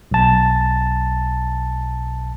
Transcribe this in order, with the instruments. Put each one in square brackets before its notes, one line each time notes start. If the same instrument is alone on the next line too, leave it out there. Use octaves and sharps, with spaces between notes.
[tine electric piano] B1 A5